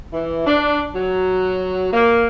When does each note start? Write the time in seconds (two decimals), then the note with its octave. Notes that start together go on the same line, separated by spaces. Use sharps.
0.13 E3
0.46 D4
0.95 F#3
1.92 A#3